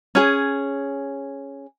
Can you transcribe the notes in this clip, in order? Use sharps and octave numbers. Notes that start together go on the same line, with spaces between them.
C#4 G#4